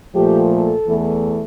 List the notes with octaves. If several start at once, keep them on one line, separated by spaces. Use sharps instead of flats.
A#2 F3 A3 G4
A4
E2 E3 A3